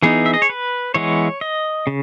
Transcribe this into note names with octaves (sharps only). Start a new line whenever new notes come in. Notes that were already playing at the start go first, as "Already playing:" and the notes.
E3 B3 D#4 G#4
E5
D#5
C#5
B4
E3 G#3 B3 C#5
D#5
C#3